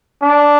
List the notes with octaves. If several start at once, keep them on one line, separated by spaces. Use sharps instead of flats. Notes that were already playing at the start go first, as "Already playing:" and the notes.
D4